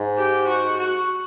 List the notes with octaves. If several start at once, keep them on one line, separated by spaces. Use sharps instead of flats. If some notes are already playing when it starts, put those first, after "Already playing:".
Already playing: G#2
G4
F#4
F#4